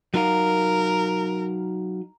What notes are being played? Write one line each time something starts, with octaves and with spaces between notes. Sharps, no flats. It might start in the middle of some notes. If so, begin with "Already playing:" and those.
F#3 D#4 A#4 F5